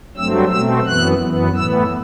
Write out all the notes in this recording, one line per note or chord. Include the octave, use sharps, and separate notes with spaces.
G2 F#3 A3 C4 E6
B2 A3 C4 E6
F#2 E3 B3 F#6
F#2 E3 B3
A2 E3 B3 E6